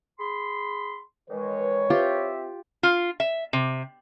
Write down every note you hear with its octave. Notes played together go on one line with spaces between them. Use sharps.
G#4 B5 C6
D#3 E3 G#3 B4 C#5
C4 F4 G4 E5
F4
E5
C3